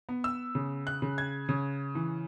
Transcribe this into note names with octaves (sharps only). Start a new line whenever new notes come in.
B3
E6
C#3
F#6
C#3
G#6
C#3
E3